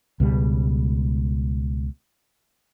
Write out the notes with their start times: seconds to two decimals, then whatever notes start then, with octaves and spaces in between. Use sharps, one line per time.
0.20 C#2 B2 G3